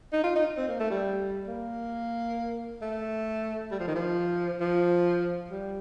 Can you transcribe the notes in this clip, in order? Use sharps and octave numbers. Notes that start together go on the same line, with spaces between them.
D#4
F4
D#4
C4
A#3
A3
G3
A#3
A3
G3
F3
D#3
F3
F3
G3